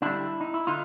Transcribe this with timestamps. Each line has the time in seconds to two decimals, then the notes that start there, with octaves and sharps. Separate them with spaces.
0.02 D3 G3 D4 E4
0.41 D#4
0.54 E4
0.67 D3 D#4 F4